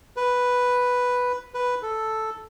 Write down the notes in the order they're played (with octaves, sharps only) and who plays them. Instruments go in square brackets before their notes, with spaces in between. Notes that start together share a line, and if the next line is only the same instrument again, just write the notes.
[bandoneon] B4
B4
A4